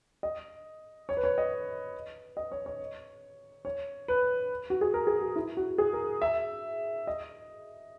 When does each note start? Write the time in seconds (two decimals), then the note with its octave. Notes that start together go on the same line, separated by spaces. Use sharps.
0.23 D#5
1.09 C#5
1.17 B4
1.24 C#5
1.38 D#5
2.37 D#5
2.52 C#5
2.66 C#5
3.65 C#5
4.08 B4
4.70 F#4
4.81 G#4
4.94 A#4
5.07 G#4
5.21 F#4
5.36 E4
5.57 F#4
5.78 G#4
5.93 A#4
6.22 E5
7.07 D#5